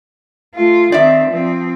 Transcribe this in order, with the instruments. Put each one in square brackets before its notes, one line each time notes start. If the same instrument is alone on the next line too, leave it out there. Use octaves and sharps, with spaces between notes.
[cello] A3 F4
[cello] D#3 C4 [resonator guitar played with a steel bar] D5 E5
[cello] F3 C4